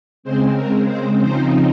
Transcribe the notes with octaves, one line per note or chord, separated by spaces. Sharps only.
C#3 G#3 C4 C5
A#4
C5
C#3 F3 C4 D#4 C5